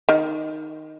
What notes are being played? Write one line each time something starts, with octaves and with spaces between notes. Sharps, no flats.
D#3